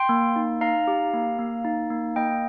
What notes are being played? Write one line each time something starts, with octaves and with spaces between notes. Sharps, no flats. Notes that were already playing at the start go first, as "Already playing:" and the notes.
Already playing: G5 C6
A#3
D#4
D#4 F5 A#5
G4
A#3
A#3
D#4
A#3
A#3 D#5 G5